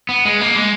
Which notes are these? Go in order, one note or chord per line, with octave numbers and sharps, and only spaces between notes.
B3
G#3
A#3
G#3